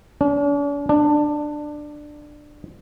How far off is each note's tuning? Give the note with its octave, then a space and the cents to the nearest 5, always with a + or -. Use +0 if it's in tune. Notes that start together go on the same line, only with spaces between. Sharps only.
D4 -45
D4 +15